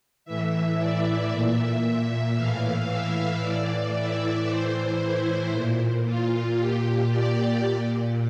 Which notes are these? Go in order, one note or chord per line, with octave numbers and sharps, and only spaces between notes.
A2 E3 E5
D5
A#2 E5
E5
A2 E3 F5
E5
A2 E3 D5
E5
A2 E3 C5
E4
A#2
F4
A#2 G4
D5
A#2